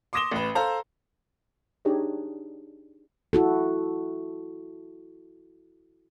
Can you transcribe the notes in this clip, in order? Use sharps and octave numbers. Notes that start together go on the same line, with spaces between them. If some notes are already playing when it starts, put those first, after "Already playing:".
C6 D6 D#6 A#6 E7 G7
A1 B4
A4 C5 F5 A#5
D4 D#4 G4 G#4 C#5 D#5
E4 F#4 A4